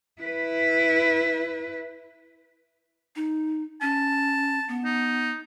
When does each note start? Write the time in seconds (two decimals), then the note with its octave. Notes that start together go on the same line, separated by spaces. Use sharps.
0.22 E4 B4
3.16 D#4
3.82 C#4 A5
4.68 B3
4.85 D#4